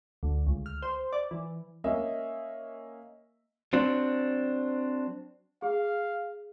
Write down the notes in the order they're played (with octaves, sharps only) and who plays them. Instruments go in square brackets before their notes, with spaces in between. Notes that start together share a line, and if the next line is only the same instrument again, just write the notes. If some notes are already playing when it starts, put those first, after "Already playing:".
[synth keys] D2
C#2
F6
C5
D5
E3
[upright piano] A#3 C#4 D#5 E5
[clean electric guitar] F#3 C4 D4
[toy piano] G#4 [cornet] F5